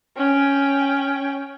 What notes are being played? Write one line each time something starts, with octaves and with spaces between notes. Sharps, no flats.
C#4 G5